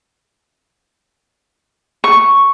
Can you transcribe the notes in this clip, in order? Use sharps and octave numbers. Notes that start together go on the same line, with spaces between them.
C#6